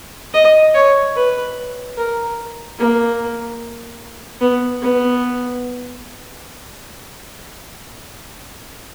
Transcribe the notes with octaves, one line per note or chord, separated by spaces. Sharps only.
D#5
C#5
B4
A#4
A#3
B3
B3